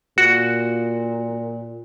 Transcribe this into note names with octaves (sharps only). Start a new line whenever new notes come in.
A#2 F#4